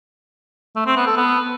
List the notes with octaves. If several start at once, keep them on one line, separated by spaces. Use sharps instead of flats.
A3
C4
B3
A4
B3